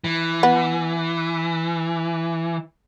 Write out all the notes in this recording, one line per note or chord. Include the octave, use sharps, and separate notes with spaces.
E3
B3